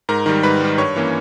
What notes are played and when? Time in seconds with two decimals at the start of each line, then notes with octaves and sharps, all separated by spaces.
0.09 G#2 A#4 A#5
0.26 D#3 G3
0.43 G#2 B4 B5
0.61 D#3 G3
0.78 G2 C#5 C#6
0.96 E3 A#3 C#4